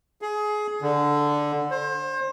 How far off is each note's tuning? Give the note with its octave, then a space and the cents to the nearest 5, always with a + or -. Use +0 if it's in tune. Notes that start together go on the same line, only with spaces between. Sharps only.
G#4 +20
D3 +0
C5 +30